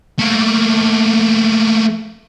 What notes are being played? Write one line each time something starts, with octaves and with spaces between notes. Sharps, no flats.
A3 A#3